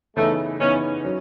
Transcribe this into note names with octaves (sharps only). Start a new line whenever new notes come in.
C#3 E3 A3 B3 D#4
C#3 E3 B3 C#4 D#4
F#3 C#4